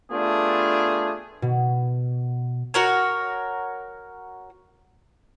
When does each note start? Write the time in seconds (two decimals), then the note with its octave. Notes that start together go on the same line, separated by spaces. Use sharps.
0.11 A3 B3 D4 F4 G4 G#4
1.42 B2
2.74 F#4 A#4 C#5